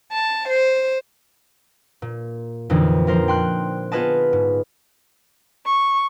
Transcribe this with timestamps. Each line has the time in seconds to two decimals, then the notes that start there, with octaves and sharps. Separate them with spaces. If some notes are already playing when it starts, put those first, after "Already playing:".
0.14 A5
0.50 C5
2.02 A#2
2.70 F2 A#2 D3 E3 D#4
3.07 F3 A#4 C5
3.28 G5 C6 F#6
3.92 B3 F4 G#4 B4 D#5 A5
4.33 G#2
5.66 C#6